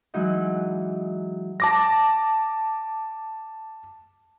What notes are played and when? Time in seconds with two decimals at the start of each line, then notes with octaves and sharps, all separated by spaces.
0.14 E3 F#3 G#3 D#4
1.60 A5 D6 A#6